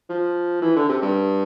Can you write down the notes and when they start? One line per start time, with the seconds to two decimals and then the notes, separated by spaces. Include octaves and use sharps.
0.09 F3
0.62 E3
0.76 D3
0.89 C3
1.02 G2